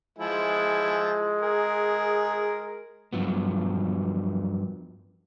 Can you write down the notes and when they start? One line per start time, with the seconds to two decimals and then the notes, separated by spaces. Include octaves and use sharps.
0.19 F3 G#3 E4 G#5
1.41 G#4 A#4
3.13 G2 B2 F3 F#3 B3